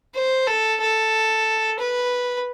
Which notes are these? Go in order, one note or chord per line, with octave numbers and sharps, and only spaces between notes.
C5
A4
A4
B4